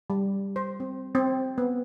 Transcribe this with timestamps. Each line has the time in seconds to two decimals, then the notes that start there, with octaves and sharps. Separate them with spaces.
0.10 G3
0.56 C5
0.80 C4
1.15 C4
1.58 B3